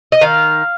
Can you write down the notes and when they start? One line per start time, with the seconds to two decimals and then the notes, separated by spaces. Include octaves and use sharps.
0.12 D#5
0.21 D#3 F5